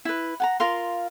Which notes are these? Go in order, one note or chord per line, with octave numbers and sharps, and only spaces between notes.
E4 B4
F#5 A5 A#5
F4 A#4 F5 C6